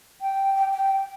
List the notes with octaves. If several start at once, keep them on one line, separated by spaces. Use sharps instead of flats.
G5
G5
G5